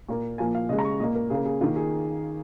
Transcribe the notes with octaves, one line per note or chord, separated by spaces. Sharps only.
A#2 A#3
A#2 F3 A#3 G#5
F5
C#3 G#3 D#5
A#5
C#6
A#2 A#3 D#5
A#4
C#3 A#3 G#4
G#4
D#3 A#3 F4
G#4